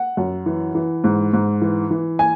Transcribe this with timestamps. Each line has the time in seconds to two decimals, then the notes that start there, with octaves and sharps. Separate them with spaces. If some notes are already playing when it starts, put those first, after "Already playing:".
Already playing: F#5
0.17 F#2
0.46 E3
0.75 E3
1.04 G#2
1.33 G#2
1.62 E3
1.91 E3
2.19 G#5